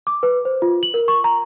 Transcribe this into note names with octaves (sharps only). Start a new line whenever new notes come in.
D6
B4
C5
F4
F#7
A#4
C#6
A#5